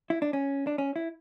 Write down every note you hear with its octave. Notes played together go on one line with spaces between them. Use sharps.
E4
D4
C#4
D4
C#4
E4